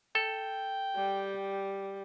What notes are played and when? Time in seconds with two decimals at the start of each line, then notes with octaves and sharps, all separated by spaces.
0.15 A4 G5
0.96 G3